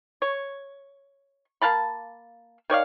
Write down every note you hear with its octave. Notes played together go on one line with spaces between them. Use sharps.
C#5
A#3 F5 A5 B5
D#3 C#5 D5 F5